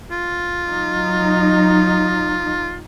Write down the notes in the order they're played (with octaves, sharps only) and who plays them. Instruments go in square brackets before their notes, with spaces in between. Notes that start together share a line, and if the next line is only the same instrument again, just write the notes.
[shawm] F4
[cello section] F#3 D#4